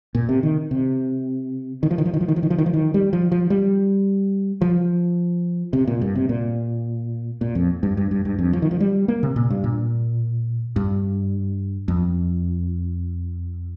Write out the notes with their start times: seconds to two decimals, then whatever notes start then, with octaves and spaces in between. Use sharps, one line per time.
0.15 A#2
0.29 C3
0.43 D#3
0.71 C3
1.83 D#3
1.91 F3
1.98 D#3
2.05 F3
2.14 D#3
2.21 F3
2.28 D#3
2.36 F3
2.43 D#3
2.50 F3
2.58 D#3
2.66 F3
2.74 D#3
2.94 G3
3.13 F3
3.32 F3
3.50 G3
4.61 F3
5.73 C3
5.88 A#2
6.02 G2
6.15 C3
6.29 A#2
7.41 A#2
7.55 F2
7.83 G2
7.97 G2
8.11 G2
8.25 G2
8.39 F2
8.53 F3
8.62 D#3
8.71 F3
8.80 G3
9.08 A#3
9.23 C3
9.36 A#2
9.50 G2
9.64 A#2
10.76 G2
11.88 F2